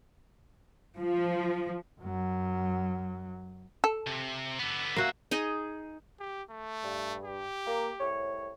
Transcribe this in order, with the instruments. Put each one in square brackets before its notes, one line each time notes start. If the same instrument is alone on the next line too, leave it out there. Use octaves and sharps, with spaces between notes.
[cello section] F3
[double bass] F#2 F#3
[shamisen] A4
[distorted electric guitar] C3
D3 B3
[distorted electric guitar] C#2 E5 [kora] A#3 F#4
[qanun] D#4 G#4 D#5
[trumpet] G4
A3
[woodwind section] G2
[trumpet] G4
[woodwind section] A#3
C2 A2 C#5